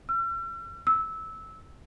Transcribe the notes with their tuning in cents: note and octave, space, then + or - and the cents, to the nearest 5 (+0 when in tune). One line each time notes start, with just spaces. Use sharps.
E6 +45
E6 -15